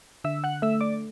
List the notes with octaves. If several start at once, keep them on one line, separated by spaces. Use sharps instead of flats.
D3 E5 E6
F#5 F#6
A3 E5 E6
D5 D6